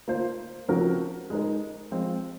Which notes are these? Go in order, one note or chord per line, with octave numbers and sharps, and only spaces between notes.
A#3 F4 C5
C#3 F3 C4 F#4 A#4
G#3 D#4 A#4
F3 G#3 C4 F4 C5